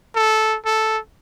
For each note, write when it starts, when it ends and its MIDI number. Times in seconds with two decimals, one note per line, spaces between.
0.16 0.57 69
0.65 0.98 69